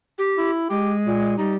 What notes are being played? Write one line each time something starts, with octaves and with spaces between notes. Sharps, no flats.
G4
E4
G#3 G4
A#2
G3 D#4